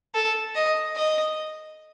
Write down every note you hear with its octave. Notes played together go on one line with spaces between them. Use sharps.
A4
D#5
D#5